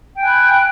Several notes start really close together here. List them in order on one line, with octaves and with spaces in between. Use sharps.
G5 G#5 F#6 B5